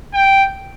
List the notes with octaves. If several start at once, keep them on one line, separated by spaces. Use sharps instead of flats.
G5